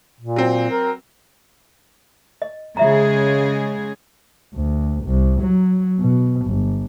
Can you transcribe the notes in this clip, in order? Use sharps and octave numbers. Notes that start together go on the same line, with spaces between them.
A#2
F#3 C4
A#4
D#5
C#3 G#3 F4 G#4 E5 A#5
D2
C2
F#3
B2
G1